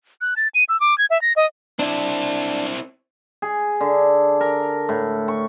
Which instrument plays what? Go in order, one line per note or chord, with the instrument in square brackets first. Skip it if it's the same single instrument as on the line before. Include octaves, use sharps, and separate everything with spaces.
[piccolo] F#6
A6
D#7
E6
D6
G#6
E5
A#6
D#5
[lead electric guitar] C4 E4 [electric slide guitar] D4
[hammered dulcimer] G#4
D3
A#4
A2
C#6